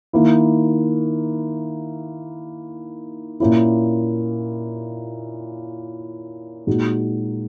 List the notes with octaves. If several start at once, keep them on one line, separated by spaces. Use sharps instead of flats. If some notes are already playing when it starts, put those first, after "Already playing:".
D#3 A#3 E4
A#2 A#3 C#4 E4
A#2 G#3 D#4 F#4